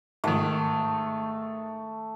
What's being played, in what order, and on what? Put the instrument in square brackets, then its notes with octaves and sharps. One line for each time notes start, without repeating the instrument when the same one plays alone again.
[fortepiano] G#2 D#3 [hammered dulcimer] A3